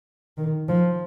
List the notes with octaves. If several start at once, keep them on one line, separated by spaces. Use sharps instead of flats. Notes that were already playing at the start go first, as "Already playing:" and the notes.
D#3
F3